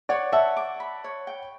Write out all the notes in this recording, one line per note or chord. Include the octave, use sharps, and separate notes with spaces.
C#5 D5 F#5
E5 F#5 A5
D6
B5
C#5
G5